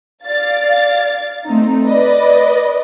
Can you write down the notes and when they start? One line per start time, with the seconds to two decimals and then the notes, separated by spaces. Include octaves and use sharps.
0.25 D5 F5 A6
1.46 A3 C4 D#4
1.85 B4 D5 D#5